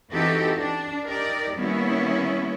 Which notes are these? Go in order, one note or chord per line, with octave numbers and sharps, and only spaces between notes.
E3 C4 D#4 F#4 G4 A4
D4
D#4 G4 A#4 D5
D#3 G3 A#3 B3 C#4 E4